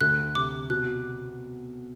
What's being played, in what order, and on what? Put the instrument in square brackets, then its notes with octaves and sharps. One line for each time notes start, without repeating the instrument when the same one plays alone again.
[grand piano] D2 [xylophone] F#6
[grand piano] C3 [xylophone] D6
[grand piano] B2 [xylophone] F#6